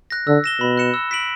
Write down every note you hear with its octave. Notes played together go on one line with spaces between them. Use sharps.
F#6 A#6
D3 E6
A#6 E7 G7
B2 B5
F#6 C#7 E7
E6
B6 D7 F#7